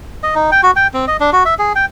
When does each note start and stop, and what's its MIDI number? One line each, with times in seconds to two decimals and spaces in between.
0.23 0.35 75
0.35 0.50 63
0.52 0.61 79
0.63 0.71 66
0.76 0.87 79
0.94 1.05 60
1.07 1.17 75
1.20 1.30 62
1.33 1.43 66
1.45 1.54 76
1.59 1.73 68
1.75 1.85 79